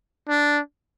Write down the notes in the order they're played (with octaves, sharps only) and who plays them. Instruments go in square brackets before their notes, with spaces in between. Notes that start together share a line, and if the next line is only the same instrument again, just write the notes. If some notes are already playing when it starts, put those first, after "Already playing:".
[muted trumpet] D4